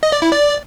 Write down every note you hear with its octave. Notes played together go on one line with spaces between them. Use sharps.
D#5
D5
E4
D5